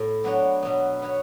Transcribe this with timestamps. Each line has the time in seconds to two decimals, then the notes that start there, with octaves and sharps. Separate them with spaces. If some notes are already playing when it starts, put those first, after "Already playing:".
Already playing: A2
0.24 F#3 B3 D4 F#4 C#5
0.62 B2 F#3 B3
1.02 B3 F#4 C#5